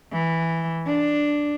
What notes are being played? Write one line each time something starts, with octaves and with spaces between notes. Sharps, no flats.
E3
D4